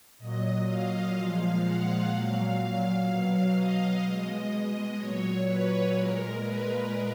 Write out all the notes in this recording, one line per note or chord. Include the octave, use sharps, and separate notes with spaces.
A#2 F#3 D#5
F5
A#2 F3 G#3 F5
F#5
A#2 F#3 F5
B2 F#3
D#5
B2 G#3
A#2 F#3 C#5
B4
A#2 G#3 A#4
B4